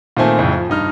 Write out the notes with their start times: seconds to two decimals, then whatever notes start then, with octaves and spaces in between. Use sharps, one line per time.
0.17 A#2 D#3 A3 C4 G#5 A5
0.39 F2 A2 C#3
0.52 F3
0.70 G2 D#4 F6